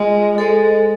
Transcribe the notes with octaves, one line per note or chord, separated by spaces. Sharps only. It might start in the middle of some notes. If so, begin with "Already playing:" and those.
Already playing: G#3 F4
G#3 A4 C5 D#5